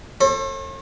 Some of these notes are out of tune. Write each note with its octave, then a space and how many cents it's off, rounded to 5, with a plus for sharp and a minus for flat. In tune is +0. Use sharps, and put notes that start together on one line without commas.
A4 +25 C#5 -45